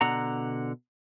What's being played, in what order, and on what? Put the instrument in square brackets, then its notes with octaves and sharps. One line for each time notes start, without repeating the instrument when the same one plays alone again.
[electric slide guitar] B2 D3 F#5 A#5